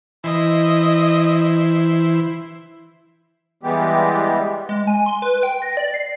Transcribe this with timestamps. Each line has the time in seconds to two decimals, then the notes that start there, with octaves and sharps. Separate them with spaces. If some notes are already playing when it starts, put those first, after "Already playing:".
0.24 E3 E4 C5 D#5
3.63 E3 G3 G#3 B3 G4
4.69 G#3
4.87 G#5
5.06 C6
5.22 B4
5.43 G5
5.62 A#6
5.77 D5
5.94 C7